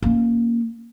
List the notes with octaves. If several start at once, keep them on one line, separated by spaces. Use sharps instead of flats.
A#3 C#4